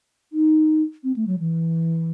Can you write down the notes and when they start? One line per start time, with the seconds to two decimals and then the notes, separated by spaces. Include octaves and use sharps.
0.33 D#4
1.04 C4
1.16 A3
1.27 F#3
1.39 E3